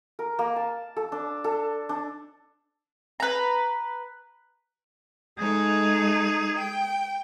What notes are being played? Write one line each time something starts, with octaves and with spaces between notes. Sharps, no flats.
A#4
A#3
A5
A4
D4
A4
D4
B4 A#5
G#3 A3 D#4 G#4
G5